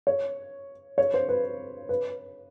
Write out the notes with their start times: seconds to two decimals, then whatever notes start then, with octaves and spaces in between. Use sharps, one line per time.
0.07 C#5
0.98 C#5
1.14 C5
1.29 B4
1.89 B4